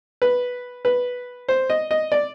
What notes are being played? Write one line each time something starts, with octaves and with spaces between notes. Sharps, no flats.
B4
B4
C5
D#5
D#5
D5